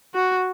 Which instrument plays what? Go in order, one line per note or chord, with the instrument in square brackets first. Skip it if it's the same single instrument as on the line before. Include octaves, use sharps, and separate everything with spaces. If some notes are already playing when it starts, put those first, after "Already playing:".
[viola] F#4